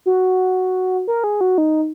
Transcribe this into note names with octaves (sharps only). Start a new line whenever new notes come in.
F#4
A#4
G#4
F#4
D#4